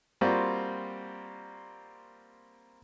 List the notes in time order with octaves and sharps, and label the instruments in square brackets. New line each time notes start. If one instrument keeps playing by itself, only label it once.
[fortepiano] G3 A#3 C4 F4 F#4